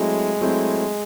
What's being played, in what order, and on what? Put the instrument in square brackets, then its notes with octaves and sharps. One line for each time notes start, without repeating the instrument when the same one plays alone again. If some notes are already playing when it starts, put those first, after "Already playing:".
Already playing: [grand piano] F#3 A3 C4 E4 [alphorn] G#3
[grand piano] F#3 A3 C4 E4